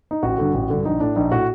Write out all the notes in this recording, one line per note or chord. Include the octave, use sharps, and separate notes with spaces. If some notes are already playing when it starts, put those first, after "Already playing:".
D#4
A1 F#4
G2 D3
A1
G2 D3
A#1 D#4
A2 D4
A#1 D#4
A2 F#4